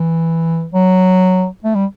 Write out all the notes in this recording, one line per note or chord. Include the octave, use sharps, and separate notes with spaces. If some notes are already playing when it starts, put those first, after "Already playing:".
Already playing: E3
F#3
A3
G3